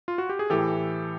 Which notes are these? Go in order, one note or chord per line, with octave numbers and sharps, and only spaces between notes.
F4
F#4
G4
G#4
A2 E3 G4 A4